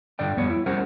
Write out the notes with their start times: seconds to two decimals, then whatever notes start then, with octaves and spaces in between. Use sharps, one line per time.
0.19 G2 D3 D5 G5
0.37 F2 G3 B3 C#5
0.50 E4
0.66 G3 C#4 G4 A#4 C5 F#5